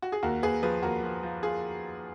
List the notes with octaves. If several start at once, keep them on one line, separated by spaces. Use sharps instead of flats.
F#4
G#4
D#2 F#4 A#4
D#2 G#4 B4
F3 G#4 B4
D#2 F#4 A#4
F3
F3
F4 G#4